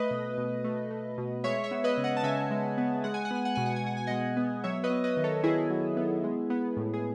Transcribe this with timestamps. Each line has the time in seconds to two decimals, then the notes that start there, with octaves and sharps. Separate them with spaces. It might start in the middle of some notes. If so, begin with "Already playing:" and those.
Already playing: A3 B4 D#5
0.11 B2
0.38 B2
0.64 A3
0.90 A3
1.18 B2
1.44 G#3 C#5 E5
1.64 C#5 E5
1.71 B3
1.84 B4 D#5
1.97 C#3
2.04 D#5 F#5
2.17 A5
2.24 C#3 E5 G#5
2.51 G#3
2.78 B3
3.04 G#3 F#5
3.14 G#5
3.25 F#5
3.31 B3 G#5
3.45 F#5
3.55 B2 G#5
3.66 F#5
3.76 G#5
3.84 B2 F#5
3.97 G#5
4.07 G#3 D#5 F#5
4.37 B3
4.64 F#3 C#5 E5
4.84 B4 D#5
4.90 B3
5.04 B4 D#5
5.17 D#3
5.24 A4 C#5
5.44 D#3 E4 G#4
5.70 F#3
5.97 B3
6.24 G#3
6.50 B3
6.77 A2
6.94 G#4